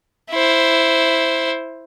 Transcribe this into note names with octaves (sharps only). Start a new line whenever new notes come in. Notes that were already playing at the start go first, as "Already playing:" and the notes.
E4 C5